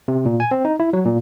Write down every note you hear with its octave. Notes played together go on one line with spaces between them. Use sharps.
C3
A#2
G#5
C4
D#4
E4
F#3
A#2